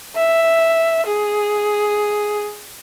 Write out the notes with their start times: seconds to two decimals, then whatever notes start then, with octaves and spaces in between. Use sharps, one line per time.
0.15 E5
1.07 G#4